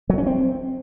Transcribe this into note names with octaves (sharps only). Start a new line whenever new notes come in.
F#3
C#4
C4